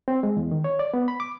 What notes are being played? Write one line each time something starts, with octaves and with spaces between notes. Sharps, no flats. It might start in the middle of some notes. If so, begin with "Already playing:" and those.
C4
G#3
E2
D#3
C#5
D5
B3
B5
D6